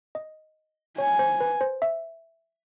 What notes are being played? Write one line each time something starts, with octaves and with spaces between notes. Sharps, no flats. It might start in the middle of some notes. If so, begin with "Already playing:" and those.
D#5
C#5 G#5
C5
B4
C5
E5